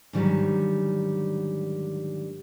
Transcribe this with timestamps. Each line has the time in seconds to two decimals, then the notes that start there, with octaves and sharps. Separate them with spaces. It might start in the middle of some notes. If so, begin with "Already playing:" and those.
0.13 G#2 D3 D#3 F#3 G3